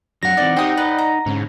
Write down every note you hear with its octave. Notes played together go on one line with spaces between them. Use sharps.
F#2 F#3 D4 F#5 A#6
E3 C4 D#4 D5
D#4 G4 C5 G5 D#6
B4 D5 D#5
A#5
G#2 D3 C#4